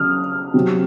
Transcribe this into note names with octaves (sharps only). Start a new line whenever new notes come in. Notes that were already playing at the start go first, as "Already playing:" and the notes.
Already playing: C#3 F#3 D#6 F6
C3 F#3